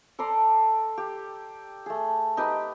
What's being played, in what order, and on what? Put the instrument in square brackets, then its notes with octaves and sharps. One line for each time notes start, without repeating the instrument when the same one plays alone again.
[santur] A4 D5 A#5 C6
G4
A3 G#4
D#4 G4 B4